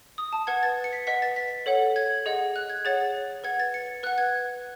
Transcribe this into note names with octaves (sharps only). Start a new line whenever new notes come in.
D#6
A5
B4 F#5 G#6
A6
C#7
B6
B4 D#5 F#5 B6
A6
B6
A4 C#5 F#5
G#6
G#4 D#5 F#5
F#6
G#6
G#4 C#5 F#5 A6
B4 F#5 G#6
A6
C#7
B4 F#5 F#6
G#6